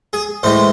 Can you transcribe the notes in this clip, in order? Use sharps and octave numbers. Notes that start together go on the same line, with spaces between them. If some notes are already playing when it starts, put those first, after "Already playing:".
G#4
A2 E3 G#3 C5